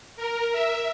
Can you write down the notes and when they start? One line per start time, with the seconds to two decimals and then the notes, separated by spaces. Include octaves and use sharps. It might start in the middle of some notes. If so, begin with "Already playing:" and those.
0.17 A#4
0.52 E5